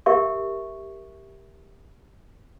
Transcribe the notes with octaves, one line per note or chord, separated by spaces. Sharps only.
G4 A#4 E5 C#6